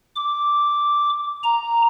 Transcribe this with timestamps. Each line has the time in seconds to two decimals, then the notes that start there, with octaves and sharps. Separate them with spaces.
0.16 D6
1.43 A#5